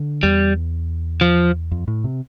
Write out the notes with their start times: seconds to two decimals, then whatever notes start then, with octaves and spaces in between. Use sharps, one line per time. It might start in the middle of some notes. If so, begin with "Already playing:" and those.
Already playing: D3
0.23 E2 G3
1.21 F3
1.71 F2
1.88 A2
2.04 C3